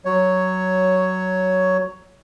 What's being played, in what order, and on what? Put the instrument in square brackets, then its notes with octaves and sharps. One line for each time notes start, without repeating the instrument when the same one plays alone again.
[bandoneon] F#3 C#5